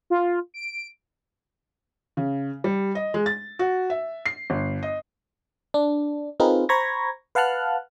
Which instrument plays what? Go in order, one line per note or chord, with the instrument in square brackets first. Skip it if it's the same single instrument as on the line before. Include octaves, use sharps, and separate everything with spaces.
[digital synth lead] F4
D7
[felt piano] C#3
G3
D#5
G#3
A6
F#4
E5
C7
G1
D#5
[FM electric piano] D4
C4 D#4 F4 G#4 A#4 B4
C5 A#5 B5 C#6 G#6 A#6
B4 F5 F#5 A5 F6 F#6